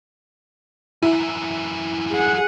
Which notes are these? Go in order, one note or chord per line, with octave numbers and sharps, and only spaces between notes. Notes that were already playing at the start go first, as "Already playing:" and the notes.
F#2 E3 E4
G#4 F#5